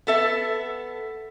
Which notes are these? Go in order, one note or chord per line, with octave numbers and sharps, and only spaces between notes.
B3 A4 E5